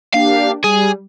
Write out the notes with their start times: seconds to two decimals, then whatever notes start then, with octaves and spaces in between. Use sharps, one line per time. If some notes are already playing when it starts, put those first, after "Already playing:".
0.14 A#3 D4 G4 F5
0.64 G3 G#4